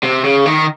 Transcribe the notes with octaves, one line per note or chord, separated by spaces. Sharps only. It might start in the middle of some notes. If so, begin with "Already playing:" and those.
C3
C#3
D#3